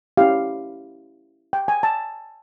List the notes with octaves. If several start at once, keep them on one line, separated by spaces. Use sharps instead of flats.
C#4 E4 G4 F5
G5
G#5
A5